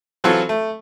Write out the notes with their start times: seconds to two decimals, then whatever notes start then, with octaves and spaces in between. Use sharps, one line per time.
0.24 E3 F#3 C4 F4 F#4 A4
0.49 A3